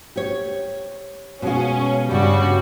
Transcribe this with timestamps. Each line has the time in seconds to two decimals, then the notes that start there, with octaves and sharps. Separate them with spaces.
0.16 G4 C#5
1.42 B2 G#3 C#4 F4
2.11 G2 C#3 G3 F#4